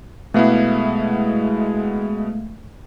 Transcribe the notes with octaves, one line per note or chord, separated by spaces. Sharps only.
B2 G#3 A3 B3 E4 F5